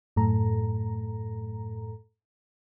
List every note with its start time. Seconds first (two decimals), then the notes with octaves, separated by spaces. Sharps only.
0.16 F#2 A2 A4 A#5